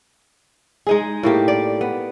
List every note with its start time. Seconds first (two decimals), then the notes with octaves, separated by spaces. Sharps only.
0.87 G#3 D#4 G#4
1.23 A2 A#3 G4
1.48 D5
1.81 B3